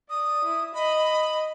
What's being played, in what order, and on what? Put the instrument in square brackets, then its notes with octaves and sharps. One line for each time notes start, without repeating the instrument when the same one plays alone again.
[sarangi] D5 [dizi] D#6
[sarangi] E4
[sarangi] D#5 [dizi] B5